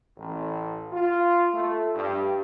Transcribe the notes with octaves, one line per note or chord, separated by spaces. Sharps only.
A1
F4
A3
G2